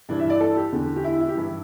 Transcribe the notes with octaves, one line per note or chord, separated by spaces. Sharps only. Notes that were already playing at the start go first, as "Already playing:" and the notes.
G2 E3 D4
E5
D5
A4
G4
E2 D3
G4
E4
E4
G4
G2 E3 E4